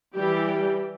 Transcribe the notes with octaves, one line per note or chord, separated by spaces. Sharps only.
E3 G3 G4